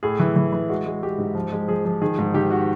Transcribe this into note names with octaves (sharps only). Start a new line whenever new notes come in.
A2 G#4
E3
E3
E3
G#3 F#4
G#3
G#3 G4
G#2
F3
G#3
F3 G#4
F3
D#3 G#4
G#2
D#3 G4
F#4